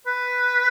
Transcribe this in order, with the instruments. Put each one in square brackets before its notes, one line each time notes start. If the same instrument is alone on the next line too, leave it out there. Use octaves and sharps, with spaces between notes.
[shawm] B4